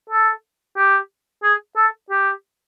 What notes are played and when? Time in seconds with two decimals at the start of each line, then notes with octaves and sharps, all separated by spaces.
0.10 A4
0.77 G4
1.43 G#4
1.77 A4
2.10 G4